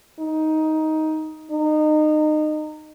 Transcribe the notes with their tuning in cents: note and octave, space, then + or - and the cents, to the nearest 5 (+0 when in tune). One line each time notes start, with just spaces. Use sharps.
D#4 +10
D#4 -25